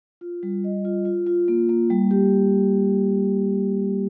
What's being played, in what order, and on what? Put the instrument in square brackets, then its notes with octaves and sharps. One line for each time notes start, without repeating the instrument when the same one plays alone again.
[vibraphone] F4
G3
D#5
F4
F4
F4
A#3
A#3
G3
G4